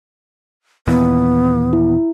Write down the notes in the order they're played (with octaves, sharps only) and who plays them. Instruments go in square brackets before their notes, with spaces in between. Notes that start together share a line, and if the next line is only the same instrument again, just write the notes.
[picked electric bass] D#2 A#2 E3 [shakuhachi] B3
[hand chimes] E4